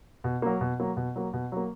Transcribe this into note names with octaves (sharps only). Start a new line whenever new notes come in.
B2
F#3 A#3
B2
F#3 A#3
B2
F#3 A#3
B2
F#3 A#3